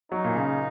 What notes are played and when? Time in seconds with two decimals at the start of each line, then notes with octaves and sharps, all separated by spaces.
0.12 F#3 D#4
0.24 A#2
0.35 C#3